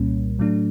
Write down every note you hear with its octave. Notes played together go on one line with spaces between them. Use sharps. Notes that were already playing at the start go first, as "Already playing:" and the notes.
Already playing: C2 A#2 G3 A#3 C#4
A2 F#3 A3 D4